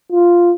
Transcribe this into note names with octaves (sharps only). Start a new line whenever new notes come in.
F4